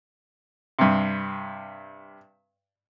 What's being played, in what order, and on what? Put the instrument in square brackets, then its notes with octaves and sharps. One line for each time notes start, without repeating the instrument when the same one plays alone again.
[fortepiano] G2 C3